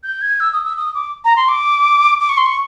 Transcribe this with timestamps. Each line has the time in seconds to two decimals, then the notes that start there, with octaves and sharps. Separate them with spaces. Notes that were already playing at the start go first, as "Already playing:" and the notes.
0.03 G6
0.22 G#6
0.40 E6
0.53 D#6
0.64 E6
0.77 D#6
0.94 D6
1.25 A#5
1.36 C6
1.49 D6
2.20 D6
2.29 C#6
2.37 C6
2.46 C#6